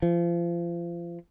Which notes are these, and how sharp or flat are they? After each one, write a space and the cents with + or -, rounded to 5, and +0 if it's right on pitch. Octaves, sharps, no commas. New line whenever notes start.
F3 -30